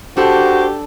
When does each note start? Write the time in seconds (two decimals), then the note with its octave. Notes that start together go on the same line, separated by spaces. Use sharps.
0.17 D4 F#4 G4 A4 C5